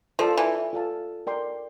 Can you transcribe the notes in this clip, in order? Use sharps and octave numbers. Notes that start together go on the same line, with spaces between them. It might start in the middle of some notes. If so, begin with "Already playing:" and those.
F3 F4 A4 D5 F5 A5
E3
F4 A4 D5 F5 A5
A#4 D5 G5 C6